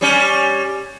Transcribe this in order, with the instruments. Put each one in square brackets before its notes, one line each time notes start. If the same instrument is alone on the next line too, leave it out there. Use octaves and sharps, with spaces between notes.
[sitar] G3 C#4